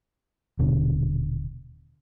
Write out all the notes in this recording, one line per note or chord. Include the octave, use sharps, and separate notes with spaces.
D#1 B2 D3